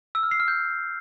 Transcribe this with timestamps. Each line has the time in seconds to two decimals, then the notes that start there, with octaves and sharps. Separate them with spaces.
0.15 E6
0.23 F6
0.31 C7
0.40 F6
0.48 G6